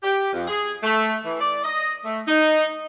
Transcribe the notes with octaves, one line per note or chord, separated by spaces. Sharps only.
G4
F2
G#4
A3
E3
D5
D#5
A3
D#4